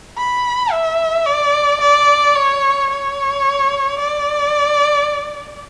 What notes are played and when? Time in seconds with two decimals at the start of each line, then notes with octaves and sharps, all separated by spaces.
0.18 B5
0.72 E5
1.26 D5
1.81 D5
2.35 C#5
2.90 C#5
3.99 D5